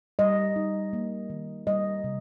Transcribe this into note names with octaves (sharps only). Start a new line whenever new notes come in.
G3 D#5
D#4
A#3
D#3
G3 D#5
C3